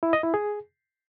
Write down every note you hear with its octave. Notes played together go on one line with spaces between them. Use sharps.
E4
D#5
E4
G#4